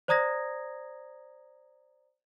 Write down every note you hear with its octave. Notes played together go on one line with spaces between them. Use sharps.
C5 D5 A#5 D#6 G#6 A#6